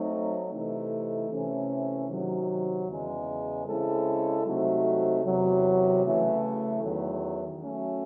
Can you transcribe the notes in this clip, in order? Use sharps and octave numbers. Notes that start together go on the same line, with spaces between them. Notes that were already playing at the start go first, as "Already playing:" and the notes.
Already playing: F#3 A3 C4 D#4
C3 E3 A3 D#4
C3 E3 A3 C#4
C3 D#3 F#3
E2 C#3 G#3
C#3 G#3 C4 E4 A4
C3 F#3 A3 C4 D#4
E2 C3 F#3
C#3 E3 A3
E2 D#3 F#3
F#3 A3 C#4